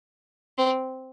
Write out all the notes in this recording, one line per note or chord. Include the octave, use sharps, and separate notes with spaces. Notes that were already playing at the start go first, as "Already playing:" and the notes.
C4